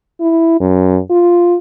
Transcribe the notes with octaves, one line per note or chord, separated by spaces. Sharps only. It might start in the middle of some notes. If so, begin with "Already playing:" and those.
E4
F#2
F4